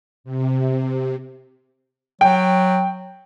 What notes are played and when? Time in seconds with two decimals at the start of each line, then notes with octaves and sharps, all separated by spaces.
0.24 C3
2.21 F#3 G5